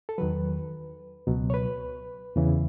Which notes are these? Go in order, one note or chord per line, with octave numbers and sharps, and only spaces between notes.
A4
E2 D#3 F#3 B4
C#2 B2 F#3
C#5
B4
E2 C#3 E3